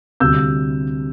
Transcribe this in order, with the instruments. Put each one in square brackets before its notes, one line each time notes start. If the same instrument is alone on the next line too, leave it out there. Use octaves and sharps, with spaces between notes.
[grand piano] D2 C3 G3 E6 G6